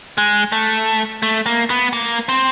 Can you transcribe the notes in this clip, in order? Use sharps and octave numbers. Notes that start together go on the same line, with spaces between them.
G#3
A3
A3
A#3
B3
A#3
C4